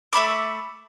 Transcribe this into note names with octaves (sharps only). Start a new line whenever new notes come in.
A3 E5 B5 D6